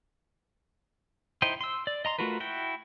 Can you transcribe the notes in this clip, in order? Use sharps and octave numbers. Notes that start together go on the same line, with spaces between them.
D#4 E4 C5 D#5 G5
C6 E6
D5
D#5 A#5 C6
A3 F4 F#4 A#4 B4
E4 F#4 G5